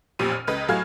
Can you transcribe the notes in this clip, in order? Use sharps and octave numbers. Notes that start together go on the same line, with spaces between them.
A1 F2 A#2 C4 G4 D#7
F6
C#2 B4 D#5
A2 F#3 G#4 F5 F6 G#6